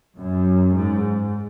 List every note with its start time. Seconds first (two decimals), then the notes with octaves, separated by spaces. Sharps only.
0.18 F#2
0.76 G#2